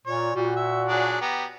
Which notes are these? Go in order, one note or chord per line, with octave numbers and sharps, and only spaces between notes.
A#2 C#5
A#2 G3 F#4
E5
F#3 D4 G#4
B3 G4 A#5